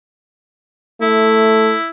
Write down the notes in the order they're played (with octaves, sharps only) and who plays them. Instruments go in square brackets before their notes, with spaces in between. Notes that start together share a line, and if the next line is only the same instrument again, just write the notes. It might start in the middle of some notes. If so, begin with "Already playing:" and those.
[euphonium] A3 [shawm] E4